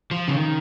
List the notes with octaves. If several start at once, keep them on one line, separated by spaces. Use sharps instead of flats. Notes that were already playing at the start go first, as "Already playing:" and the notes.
F3
C#3
D#3